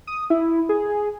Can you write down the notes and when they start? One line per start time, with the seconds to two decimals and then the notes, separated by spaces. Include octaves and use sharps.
0.07 D#6
0.30 E4
0.69 G#4